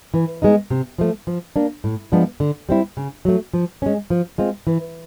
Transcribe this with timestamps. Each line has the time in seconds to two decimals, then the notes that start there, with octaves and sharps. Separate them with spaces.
0.14 E3
0.42 G#3 B3 D#4
0.70 C3
0.98 F3 A3
1.27 F3
1.56 A#3 D4
1.84 A2
2.12 F3 G#3 B3 D4
2.40 D3
2.69 G3 C4 E4
2.97 C#3
3.25 F#3 A3
3.54 F3
3.82 G#3 C#4
4.10 F3
4.38 G#3 C4 F4
4.67 E3